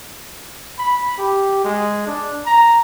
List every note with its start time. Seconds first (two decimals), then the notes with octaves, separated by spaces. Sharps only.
0.79 B5
1.18 G4
1.64 G#3
2.07 D4
2.46 A#5